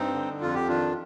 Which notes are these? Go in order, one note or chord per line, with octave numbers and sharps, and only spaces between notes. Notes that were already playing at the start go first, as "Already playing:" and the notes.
Already playing: G2 C4 D#4
D3
F2 F4
G4
D#3 D4 F4